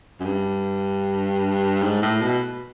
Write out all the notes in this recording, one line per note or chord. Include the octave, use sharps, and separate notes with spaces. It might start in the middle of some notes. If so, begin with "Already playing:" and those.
F#2
G2
G#2
A2
B2